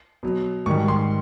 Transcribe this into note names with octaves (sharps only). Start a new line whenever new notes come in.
B2 F#3
G#2 D#3 G3 C#6
C6